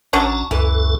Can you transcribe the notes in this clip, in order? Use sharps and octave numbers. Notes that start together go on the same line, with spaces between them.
A1 F#3 C#4 D4 A5 A#5
C#2 F#2 E3 A4